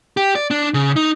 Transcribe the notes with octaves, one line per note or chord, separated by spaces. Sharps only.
G4
D5
D4
C#3
D#4